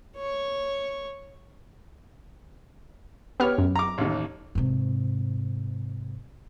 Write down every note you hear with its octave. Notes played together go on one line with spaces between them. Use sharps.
C#5 C#6
B3 G4 C#5 F6
F#2
A#5 D6
A1 D#2
G#2 C3